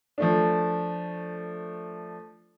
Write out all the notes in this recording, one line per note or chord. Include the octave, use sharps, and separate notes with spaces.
F3 A3 D4